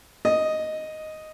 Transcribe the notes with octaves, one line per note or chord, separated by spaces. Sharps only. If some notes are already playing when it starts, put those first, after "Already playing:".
D#5